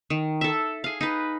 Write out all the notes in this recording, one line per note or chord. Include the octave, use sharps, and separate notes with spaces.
D#3
A4 E5
G#4 F5
D#4 B4